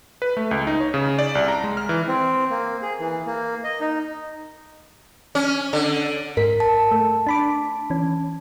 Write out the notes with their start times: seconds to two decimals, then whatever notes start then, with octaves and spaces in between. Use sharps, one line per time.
0.22 B4
0.37 A3
0.51 C#2
0.67 D#4
0.80 C#5
0.94 C#3
1.19 D5
1.35 C2
1.48 A#5
1.64 G#3
1.77 F6
1.89 E3
2.07 C4
2.50 A#3
2.82 G#4
3.00 E3
3.26 A#3
3.64 D#5
3.81 D#4
5.35 C#4
5.73 D3
6.37 G#2 A#4 B6
6.60 A5
6.92 A3
7.27 D4 B5 D6
7.90 E3 C#4